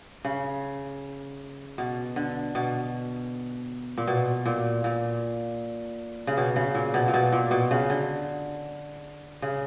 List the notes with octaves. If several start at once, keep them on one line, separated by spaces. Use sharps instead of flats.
C#3
B2
D3
B2
A#2
B2
A#2
A#2
C#3
B2
C#3
A#2
B2
A#2
B2
A#2
B2
C#3
D3
C#3